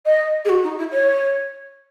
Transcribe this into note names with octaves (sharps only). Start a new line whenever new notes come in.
D#5
G#4
F#4
D#4
E4
C#5